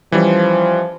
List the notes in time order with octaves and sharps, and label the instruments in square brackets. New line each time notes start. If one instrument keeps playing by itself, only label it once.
[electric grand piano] E3 G3 C#4 [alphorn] F3